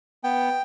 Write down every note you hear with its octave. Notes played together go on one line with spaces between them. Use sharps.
B3 G5